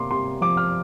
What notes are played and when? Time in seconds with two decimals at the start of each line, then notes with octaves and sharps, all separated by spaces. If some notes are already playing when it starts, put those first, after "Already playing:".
Already playing: C3 A#3 C6 D6
0.11 C3 C6
0.41 F3 D6
0.57 F6